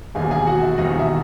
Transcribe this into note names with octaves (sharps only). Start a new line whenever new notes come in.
E1 D#2 D#3 G#4 G#5
G#4 G#5
F#4 F#5
E4 E5
E1 D#2 D#3 D#4 D#5
E5